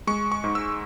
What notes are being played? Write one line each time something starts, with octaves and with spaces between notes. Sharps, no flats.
G#3 C#6
C#6
G#2
E6